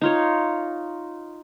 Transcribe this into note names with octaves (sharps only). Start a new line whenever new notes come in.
D#4 F4 C#5